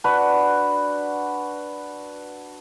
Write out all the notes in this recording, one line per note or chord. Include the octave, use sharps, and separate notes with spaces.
D4 F#4 B4